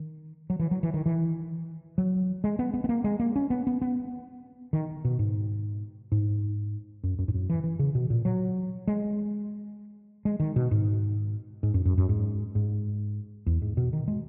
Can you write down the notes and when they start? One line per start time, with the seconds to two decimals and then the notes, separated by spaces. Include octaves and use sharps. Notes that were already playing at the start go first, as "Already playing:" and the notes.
Already playing: D#3
0.50 F#3
0.59 E3
0.71 F#3
0.83 E3
0.94 D#3
1.06 E3
1.98 F#3
2.44 G#3
2.59 B3
2.74 B3
2.84 B3
2.89 A#3
3.04 G#3
3.20 A#3
3.36 C#4
3.50 B3
3.67 B3
3.82 B3
4.73 D#3
5.05 B2
5.19 G#2
6.12 G#2
7.03 F#2
7.19 F#2
7.28 G#2
7.34 F#2
7.50 E3
7.64 E3
7.79 C#3
7.95 B2
8.10 A#2
8.25 F#3
8.87 G#3
10.25 G#3
10.40 D#3
10.56 B2
10.71 G#2
11.63 G#2
11.74 F#2
11.85 F#2
11.98 F#2
12.09 G#2
12.55 G#2
13.46 E2
13.62 G#2
13.77 B2
13.93 D#3
14.08 G#3